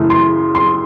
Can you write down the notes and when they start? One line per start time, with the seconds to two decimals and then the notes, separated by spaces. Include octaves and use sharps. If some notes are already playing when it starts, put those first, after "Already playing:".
Already playing: F#2 C#3 E3 A3
0.10 C6
0.55 C6